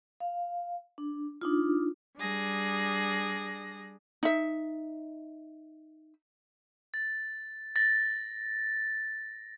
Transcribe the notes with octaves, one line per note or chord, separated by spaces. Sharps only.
F5
D4
D4 D#4 F4
G3 D4 G#4 A#6
D#4 E5
A6
A6 A#6